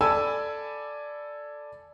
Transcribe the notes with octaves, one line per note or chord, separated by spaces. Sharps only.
A4 D5 G#5 A5 B5 E6